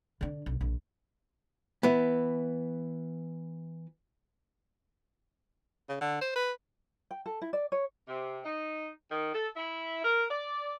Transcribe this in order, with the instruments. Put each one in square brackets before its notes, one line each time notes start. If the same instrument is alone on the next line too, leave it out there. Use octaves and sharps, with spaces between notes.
[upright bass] D3 D4
B1
A#1 E3
[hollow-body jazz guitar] E3 B3
[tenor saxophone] C#3
D3
C5
B4
[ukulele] G5
A4
E4
D5
C#5
[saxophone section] C3
D#4
D#3
A4
E4
A#4
D5